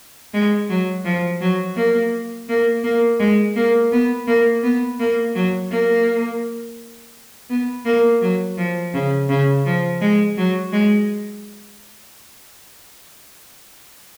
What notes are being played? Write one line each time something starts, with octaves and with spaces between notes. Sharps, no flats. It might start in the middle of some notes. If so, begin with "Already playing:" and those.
G#3
F#3
F3
F#3
A#3
A#3
A#3
G#3
A#3
B3
A#3
B3
A#3
F#3
A#3
B3
A#3
F#3
F3
C#3
C#3
F3
G#3
F#3
G#3